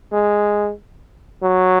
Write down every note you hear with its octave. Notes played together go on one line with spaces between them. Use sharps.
G#3
F#3